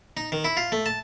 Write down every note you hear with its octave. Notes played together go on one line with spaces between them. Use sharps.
D#4
D#3
E4
F4
A3
A5